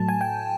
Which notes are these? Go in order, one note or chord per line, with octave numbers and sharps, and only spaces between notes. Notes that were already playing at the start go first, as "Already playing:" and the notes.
Already playing: A2 F#3 A3 A5
G#5
G5